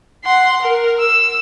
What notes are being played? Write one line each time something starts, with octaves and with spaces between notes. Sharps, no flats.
F#5 C6
A#4
E6